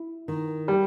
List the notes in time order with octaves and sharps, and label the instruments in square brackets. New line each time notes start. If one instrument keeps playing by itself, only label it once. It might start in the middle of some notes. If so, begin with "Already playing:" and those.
Already playing: [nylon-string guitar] E4
D#3
[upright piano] G3